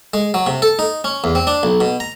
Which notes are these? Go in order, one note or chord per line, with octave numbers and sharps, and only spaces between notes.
G#3
F#3
C3
A4
D#4
C#4
E2
C4
D4
B1
B2
A#5